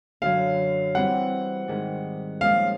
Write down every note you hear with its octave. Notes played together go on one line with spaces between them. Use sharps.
F#2 D3 F#3 F5
E3 G3 C4 E4 F#5
G#2 D#3 G3
A#2 F3 G#3 C#4 F5